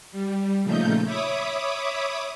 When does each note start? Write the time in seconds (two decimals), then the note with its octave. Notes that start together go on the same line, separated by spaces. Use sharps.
0.12 G3
0.63 A#2 C#3 F3 A3 D#4 G6
1.05 C#5 E5 B5 D6 D#6